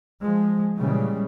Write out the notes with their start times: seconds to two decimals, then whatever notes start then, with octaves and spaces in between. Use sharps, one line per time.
0.22 F3 G#3
0.79 A#2 C#3 E3 G3 G#3